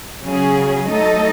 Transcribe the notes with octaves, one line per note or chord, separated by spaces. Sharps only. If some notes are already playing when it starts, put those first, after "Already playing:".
C#3 F#3 C#4 G#4
F#3 A3 D#4 A4 D#5